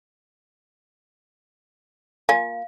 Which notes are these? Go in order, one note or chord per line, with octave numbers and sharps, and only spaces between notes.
A#3 F4 F5 G#5